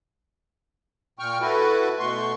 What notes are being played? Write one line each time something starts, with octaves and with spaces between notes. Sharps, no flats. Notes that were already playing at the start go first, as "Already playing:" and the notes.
A#2 G5 C#6 F6
E4 F#4 A4 B4
B2 A3 C6 C#6